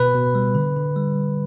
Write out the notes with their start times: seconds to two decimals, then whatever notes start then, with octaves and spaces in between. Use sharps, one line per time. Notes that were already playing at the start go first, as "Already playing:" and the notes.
Already playing: B2 B4
0.15 B2
0.35 G3
0.55 D3
0.76 D3
0.96 G3